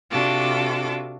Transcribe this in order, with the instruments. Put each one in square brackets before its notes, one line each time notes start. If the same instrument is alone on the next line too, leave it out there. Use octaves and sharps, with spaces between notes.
[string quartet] C3 D4 F4 F#4 A4 D6